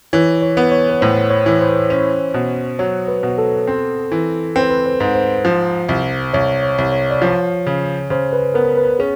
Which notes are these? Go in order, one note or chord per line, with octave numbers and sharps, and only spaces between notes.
E3 C#5
C#5
B3
C#5
B4
A2 C5
C#5
E3
C5
C#4 C5
B2
F#3 C#5
B4
B2
A4
C4
E3
C4 B4
C5
B4
C5
G#2
C5
F3
C2
C2 C#5
C#5
C2
C#5
D5
F3 C#5
C#3
C#3 C5
B4
B3 A#4
B4
C#4 G#4